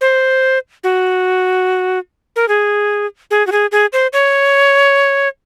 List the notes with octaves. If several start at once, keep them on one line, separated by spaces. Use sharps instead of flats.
C5
F#4
A#4
G#4
G#4
F#4
G#4
G#4
C5
C#5